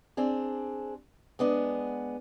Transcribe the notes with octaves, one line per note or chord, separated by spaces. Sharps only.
C4 D4 G#4
G#3 B3 D4